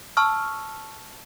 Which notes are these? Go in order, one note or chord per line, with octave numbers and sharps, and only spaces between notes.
A5 C#6 E6 F6